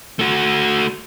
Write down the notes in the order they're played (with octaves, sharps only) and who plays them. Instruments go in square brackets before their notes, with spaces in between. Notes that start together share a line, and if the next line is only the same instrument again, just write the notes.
[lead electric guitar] A3 F#4